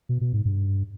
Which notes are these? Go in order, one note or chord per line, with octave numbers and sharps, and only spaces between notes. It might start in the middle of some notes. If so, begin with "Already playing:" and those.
B2
B2
G#2
G2